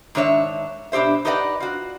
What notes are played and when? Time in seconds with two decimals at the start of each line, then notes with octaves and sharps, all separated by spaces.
0.15 G#2 D#3 D4 C#5 E5
0.92 B2 D4 G4 C5 E5
1.25 D#4 G4 B4 D5 D#5 F#5
1.60 F4 F#4